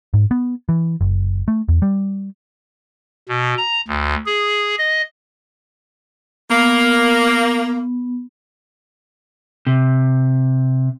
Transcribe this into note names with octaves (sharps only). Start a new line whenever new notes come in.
G#2
B3
E3
F#1
A3
E2
G3
B2
A#5
D2
G#4
D#5
A#3 B3
C3